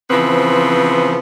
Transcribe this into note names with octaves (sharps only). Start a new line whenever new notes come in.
C#3 E3 F3 B3 C4